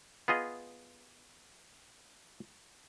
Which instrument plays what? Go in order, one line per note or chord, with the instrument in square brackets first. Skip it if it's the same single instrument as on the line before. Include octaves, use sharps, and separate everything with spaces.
[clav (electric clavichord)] B3 F4 G#4 D#5